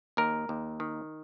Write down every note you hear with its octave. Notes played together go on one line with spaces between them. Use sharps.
D#2 A#4
D#2
D#3